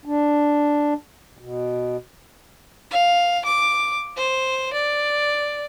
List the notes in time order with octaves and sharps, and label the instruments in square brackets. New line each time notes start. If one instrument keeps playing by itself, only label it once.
[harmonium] D4
B2
[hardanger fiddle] F5
D6
C5
D5